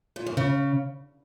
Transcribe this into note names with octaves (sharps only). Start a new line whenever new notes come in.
A#2
F#2
C#3